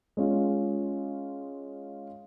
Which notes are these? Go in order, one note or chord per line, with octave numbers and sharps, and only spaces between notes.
G#3 C#4 F4